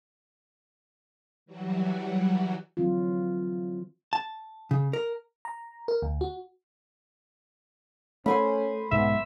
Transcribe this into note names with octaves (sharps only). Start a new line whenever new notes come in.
E3 F#3 G3 F#4
D3 E3 F#3 C4 F4
A5
C#3
A#4
A#5
A#4
D2
F#4
A3 C#4 C5 G#5 B5
B1 G#2 B3 E5